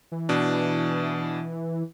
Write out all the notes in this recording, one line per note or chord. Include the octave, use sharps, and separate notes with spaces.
E3
B2 D4